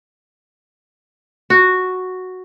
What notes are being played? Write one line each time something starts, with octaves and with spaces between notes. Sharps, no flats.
F#4